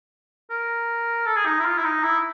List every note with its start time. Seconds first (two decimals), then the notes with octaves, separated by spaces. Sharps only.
0.50 A#4
1.26 A4
1.36 G#4
1.46 D#4
1.60 E4
1.65 F4
1.78 E4
1.84 D#4
2.03 E4